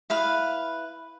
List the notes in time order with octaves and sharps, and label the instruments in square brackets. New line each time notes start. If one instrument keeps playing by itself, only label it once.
[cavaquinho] E4 B4 F5